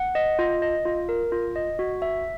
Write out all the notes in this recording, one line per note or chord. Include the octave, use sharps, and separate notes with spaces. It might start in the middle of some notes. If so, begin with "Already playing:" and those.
Already playing: F#5
D#5
F4
D#5
F4
A#4
F4
D#5
F#4
E5